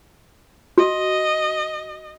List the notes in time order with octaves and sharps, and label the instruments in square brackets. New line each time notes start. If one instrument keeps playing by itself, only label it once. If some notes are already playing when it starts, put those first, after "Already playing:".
[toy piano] F#4 [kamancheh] D#5